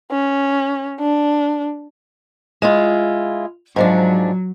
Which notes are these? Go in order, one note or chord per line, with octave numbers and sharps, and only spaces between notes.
C#4
D4
G#3 E4 F4
G#2 F3 F#3 D4